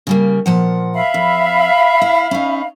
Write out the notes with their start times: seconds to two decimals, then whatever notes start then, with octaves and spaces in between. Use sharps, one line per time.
0.07 C#3 G3 A#3
0.46 A#2 F3 F#5
0.95 E5 F5 B5
1.14 F2
2.02 E4
2.31 C#4 D#4